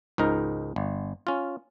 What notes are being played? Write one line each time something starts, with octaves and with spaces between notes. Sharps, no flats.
C#2 G#2 D#4 A#4
G1
C#4 F4